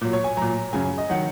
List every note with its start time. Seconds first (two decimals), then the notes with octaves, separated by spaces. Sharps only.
0.01 A#2 F#3
0.13 C#5
0.24 G#5
0.37 A#2 F#3 A#5
0.73 F#2 C#3 F#3 G#5
0.98 D#5
1.09 D#3 F#3 F#5